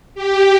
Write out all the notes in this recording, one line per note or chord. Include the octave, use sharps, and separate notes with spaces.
G4